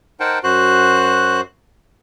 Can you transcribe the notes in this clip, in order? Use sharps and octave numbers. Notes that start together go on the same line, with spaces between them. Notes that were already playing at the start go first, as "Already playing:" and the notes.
D#4 A#4 C5 F#5 G5 A5
F#2 F#4 C5 F#6